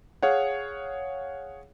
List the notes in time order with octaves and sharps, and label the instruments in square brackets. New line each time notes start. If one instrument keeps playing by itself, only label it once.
[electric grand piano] G#4 C#5 F5 F#5